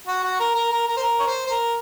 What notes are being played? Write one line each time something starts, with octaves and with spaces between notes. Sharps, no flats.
F#4
F#4
A#4
A#4
A#4
A#4
C5
A#4
C#5
C5
C5
A#4